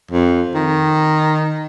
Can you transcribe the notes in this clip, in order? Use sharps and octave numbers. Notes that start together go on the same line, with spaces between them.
F2
D#3